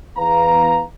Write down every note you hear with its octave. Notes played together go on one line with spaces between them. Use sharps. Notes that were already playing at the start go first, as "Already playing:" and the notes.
E2 B4 F5 A#5